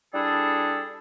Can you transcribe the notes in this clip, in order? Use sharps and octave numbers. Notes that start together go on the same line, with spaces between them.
G3 D4 E4 G#4 A4